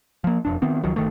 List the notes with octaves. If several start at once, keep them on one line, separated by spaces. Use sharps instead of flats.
F3 A#3
E1 F2 D4
D#3 B3 C4
C#2 D#3 F3 F#3
G1 D#3 A3